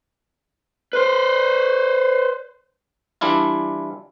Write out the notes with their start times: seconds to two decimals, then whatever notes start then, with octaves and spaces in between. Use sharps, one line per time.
0.93 B4 C5
3.21 E3 G3 D4 E4 F4